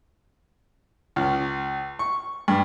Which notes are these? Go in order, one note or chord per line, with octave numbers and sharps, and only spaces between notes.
C#2
C#6
G2